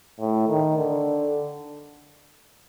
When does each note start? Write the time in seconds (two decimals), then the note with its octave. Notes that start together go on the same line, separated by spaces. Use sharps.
0.19 A2
0.48 D#3
0.77 D3